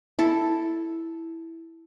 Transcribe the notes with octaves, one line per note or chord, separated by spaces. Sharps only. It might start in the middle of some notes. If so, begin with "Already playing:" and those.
E4 A4